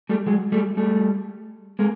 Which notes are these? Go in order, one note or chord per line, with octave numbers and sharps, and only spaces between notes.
G3 A3
F#3 G#3
G3 A3
G3 A3
G#3 A#3